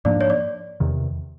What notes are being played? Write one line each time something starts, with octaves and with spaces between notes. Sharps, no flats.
G#2 F3 A#3 D4 D5
C#5
D5
E2 C3 D#3